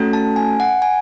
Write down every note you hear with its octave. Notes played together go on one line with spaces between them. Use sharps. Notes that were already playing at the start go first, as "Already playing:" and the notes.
Already playing: A3 C#4 F#4 A4
A5
G#5
F#5
G#5